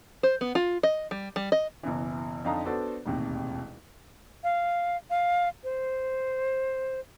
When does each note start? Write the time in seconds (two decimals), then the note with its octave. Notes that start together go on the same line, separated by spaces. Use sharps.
0.23 C5
0.41 B3
0.55 F4
0.83 D#5
1.11 G3
1.36 G3
1.52 D#5
1.83 F#1 B2 E3
2.44 F2 D3 D#4 F5 A5 A#5
2.65 B3 D4 F#4 A4 C5 D5
3.06 E1 A1 D#2 C3
4.44 F5
5.10 F5
5.64 C5